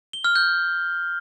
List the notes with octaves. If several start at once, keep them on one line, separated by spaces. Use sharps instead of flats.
G7
F6
G6